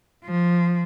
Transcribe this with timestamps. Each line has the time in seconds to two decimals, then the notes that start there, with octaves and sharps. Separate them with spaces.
0.25 F3